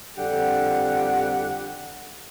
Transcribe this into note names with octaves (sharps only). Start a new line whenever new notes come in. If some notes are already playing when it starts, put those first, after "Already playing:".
F2 D3 G3 G4 F#5